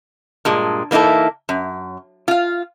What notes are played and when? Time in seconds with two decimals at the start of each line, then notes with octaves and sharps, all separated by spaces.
0.45 G2 A#2 G#3
0.91 E3 A#3 D#4 E4 A4
1.49 F#2
2.28 F4 F5